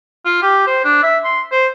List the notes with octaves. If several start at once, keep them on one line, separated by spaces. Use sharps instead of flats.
F4
G4
C5
D4
E5
C6
C5